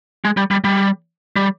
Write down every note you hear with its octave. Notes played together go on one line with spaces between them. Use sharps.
G#3
G3
G3
G3
G3